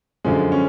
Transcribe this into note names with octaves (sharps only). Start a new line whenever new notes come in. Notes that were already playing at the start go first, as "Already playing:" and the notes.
F#2 D3 F3 G#3
C#4